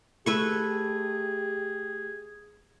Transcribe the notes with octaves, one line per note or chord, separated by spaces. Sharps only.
A3 G4 G#4 B4 C#6